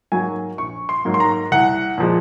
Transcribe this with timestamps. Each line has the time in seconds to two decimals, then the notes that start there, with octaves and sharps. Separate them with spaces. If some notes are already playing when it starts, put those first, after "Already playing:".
0.12 G#2 F#3 A#3 G#5
0.58 A#1 C#6
0.89 C6
1.05 G#2 F#3 A#3
1.14 C6
1.20 A#5
1.51 C2 F#5
1.98 A#2 F3 G#3